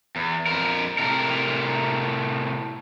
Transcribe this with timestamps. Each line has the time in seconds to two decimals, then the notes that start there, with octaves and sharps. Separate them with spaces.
0.16 E2
0.46 F2 A#4
0.98 A2 C3 A#4